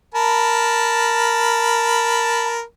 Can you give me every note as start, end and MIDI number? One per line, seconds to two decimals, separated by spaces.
0.15 2.61 70
0.15 2.61 81
0.15 2.61 83